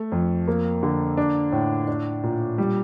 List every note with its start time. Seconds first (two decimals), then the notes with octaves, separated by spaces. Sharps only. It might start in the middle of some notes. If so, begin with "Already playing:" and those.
Already playing: A3
0.12 F2
0.48 A#3
0.83 D3
1.17 D4
1.52 A2
1.88 D4
2.23 A#2
2.58 G3